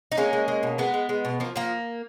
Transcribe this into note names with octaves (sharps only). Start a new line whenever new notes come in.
D#4
G#3 A#3 C#4
G#3
G#3
B2
G#3 B3
G#3
G#3
B2
F3 A#3
F3 A#3